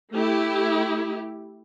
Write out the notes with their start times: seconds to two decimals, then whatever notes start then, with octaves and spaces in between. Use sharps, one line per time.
0.13 A3 E4 G4